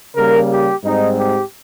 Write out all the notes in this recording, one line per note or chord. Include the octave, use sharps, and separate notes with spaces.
C#3 G3 A#3 A#4
G4
G#2 G3 C4 D#4
G4